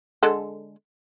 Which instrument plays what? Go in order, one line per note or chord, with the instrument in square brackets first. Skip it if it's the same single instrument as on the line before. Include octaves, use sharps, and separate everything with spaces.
[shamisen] D3 G#3 A4